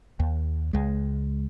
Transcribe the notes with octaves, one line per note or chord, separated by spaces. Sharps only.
D#2
C#2 G#3